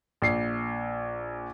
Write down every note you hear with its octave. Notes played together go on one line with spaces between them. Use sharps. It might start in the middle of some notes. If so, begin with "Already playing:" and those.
A#1 C7